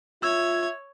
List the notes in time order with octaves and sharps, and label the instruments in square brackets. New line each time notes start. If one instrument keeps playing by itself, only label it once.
[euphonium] F4 [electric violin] C#5 G#6 [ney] E5 [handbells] E6